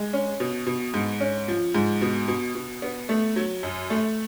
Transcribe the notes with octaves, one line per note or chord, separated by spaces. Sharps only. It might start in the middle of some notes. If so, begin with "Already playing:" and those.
Already playing: G#3
C#4
B2
B2
G#2
C#4
F3
G#2
B2
B2
B2
B3
A3
F#3
F#2
A3